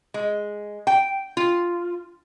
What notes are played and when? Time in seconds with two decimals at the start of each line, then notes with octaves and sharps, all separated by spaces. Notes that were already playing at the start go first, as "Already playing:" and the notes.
0.14 G#3
0.87 G5
1.37 F4